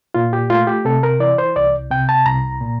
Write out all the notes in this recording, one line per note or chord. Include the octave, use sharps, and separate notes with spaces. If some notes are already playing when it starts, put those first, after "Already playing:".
A#2 F4
G4
A3 F4
G4
C3 A4
A#4
E3 D5
C5
C2 D5
C3 G5
A5
C2 A#5
A#2